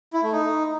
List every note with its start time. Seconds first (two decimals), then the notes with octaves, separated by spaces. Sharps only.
0.13 E4
0.23 A3
0.33 D#4